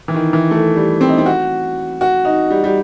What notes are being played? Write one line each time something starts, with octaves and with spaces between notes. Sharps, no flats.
E3
D#3
E3
A3
G3
C4
D#4
C4
F#4
F#4
D#4
G3
G3